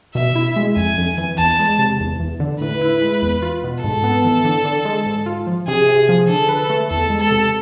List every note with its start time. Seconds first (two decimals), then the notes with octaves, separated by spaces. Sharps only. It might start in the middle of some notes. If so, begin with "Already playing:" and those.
0.15 B2 E5
0.36 E4
0.56 G#3
0.76 F2 G#5
0.98 F2
1.18 E3
1.38 E2 A5
1.59 G#3
1.79 C3
2.00 E2
2.20 E2
2.40 D3
2.61 A2 B4
2.81 E4
3.01 G#3
3.22 E2
3.42 F4
3.64 B2
3.83 G#2 A4
4.04 B3
4.25 E3
4.45 D3
4.65 D3
4.85 G#3
5.06 G#2
5.26 F4
5.47 F3
5.67 C3 G#4
5.88 C3
6.09 F3
6.29 D3 A4
6.49 B4
6.70 A3
6.90 E2 A4
7.10 G#3
7.20 A4
7.31 C3